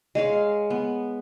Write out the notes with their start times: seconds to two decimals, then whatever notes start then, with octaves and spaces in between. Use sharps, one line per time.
0.15 G#3 C#5 F5
0.70 B3